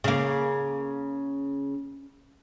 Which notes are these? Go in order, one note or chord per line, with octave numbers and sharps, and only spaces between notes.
C#3 A#3